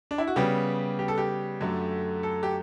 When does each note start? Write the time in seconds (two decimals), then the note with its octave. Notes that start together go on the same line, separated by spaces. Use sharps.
0.11 D4
0.18 E4
0.27 F#4
0.36 C#3 G3 B3 G4
0.99 G4
1.08 A4
1.18 G4
1.61 F#2 D3 A3
2.23 A4
2.43 G4